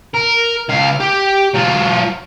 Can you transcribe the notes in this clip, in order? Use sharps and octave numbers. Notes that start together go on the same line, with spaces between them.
A#4
C#2 F5
G4
F#3 F4